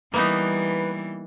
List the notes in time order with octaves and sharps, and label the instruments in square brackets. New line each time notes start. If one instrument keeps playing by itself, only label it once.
[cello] E3 G3 [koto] A#3 B3 D#4 [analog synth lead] B4